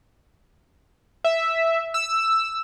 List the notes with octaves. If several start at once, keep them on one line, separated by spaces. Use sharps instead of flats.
E5
E6